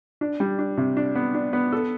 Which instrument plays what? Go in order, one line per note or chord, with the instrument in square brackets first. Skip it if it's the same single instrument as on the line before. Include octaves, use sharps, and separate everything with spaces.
[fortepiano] D4
G3
D4
C3
D4
B3
D4
B3
A4